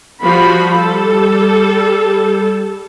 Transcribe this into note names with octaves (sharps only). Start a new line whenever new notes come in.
F3 G3 F#4 B5
G3 A4